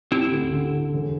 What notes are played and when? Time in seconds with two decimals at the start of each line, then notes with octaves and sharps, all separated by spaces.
0.11 C4 E4 G4
0.31 D2
0.52 D3
0.72 D3
0.93 E1